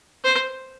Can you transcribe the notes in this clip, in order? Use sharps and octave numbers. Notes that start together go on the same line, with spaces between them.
C5